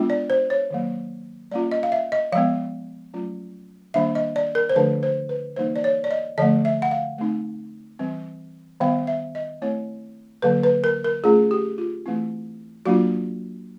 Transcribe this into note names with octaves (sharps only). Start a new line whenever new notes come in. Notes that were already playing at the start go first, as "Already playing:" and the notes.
Already playing: G#3 B3 D4 F4
D5
C5
C#5
D#3 F#3 A#3
G3 A#3 C#4 F4 D5
D#5
F5
E5
D#5
F3 G#3 B3 F5
F#3 A3 C#4 F4
D#3 G3 A#3 D4 E5
D#5
D5
A#4
C5
D3 F3 A3 D4 B4
C5
B4
E3 G3 A#3 D#4 C5
D5
C#5
D5
D#5
D3 F3 A3 D#5
E5
F#5
F5
A3 C4 D#4
E3 G3 C4
D#3 G3 B3 F5
E5
D#5
A3 C4 E4 C#5
D3 F#3 A#3 B4
B4
A#4
A#4
A3 C#4 F4 G#4
G4
F4
E3 A3 C4 E4
F#3 A#3 D4 F4 F#4